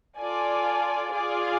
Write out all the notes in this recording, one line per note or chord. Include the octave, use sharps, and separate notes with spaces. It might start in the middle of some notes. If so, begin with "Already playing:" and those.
F4 A4 D5 G#5
F4 G#4 D5 F5 G#5